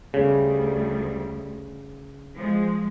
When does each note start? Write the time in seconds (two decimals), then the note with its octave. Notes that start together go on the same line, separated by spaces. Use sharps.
0.14 D2 C#3 G3
2.35 F3 G#3